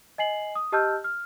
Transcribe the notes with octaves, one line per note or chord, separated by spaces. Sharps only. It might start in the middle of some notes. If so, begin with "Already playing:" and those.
D#5 G#5 C7 F#7
D#6
G4 D#5 A5 E6 F6 G6
F6